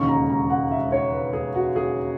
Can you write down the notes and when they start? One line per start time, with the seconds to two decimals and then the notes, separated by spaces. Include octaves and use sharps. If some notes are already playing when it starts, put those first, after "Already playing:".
Already playing: E1 D#2 C#3 G#3 C#6
0.08 A#5
0.30 A#5
0.50 F#5
0.71 E5
0.92 C#5
1.13 B4
1.33 G#4
1.55 F#4
1.76 G#4